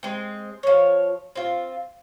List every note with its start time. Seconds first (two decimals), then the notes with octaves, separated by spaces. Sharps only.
0.03 G#3 C4
0.63 F3 C#5
1.35 C4 F4